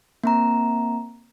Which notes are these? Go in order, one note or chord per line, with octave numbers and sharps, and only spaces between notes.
A#3 C4 A#5